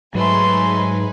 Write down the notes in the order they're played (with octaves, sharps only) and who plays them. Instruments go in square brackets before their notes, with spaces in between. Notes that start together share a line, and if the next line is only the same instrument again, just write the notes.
[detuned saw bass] G#2 [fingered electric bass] F#3 [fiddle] A3 C6 [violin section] D#4 B4 G#5